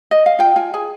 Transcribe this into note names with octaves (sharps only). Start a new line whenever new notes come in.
D#5
F5
F4 G5
F4 G#5
G#4 G#5